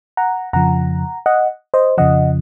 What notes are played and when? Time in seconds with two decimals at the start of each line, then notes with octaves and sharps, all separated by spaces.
0.17 F#5 A#5
0.53 F2 C#3 F3 F#5 A#5
1.26 D#5 F#5
1.74 C5 D#5
1.98 F2 C#3 F3 D#5 F#5